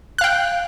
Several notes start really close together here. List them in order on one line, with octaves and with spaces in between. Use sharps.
F#6 F5 G5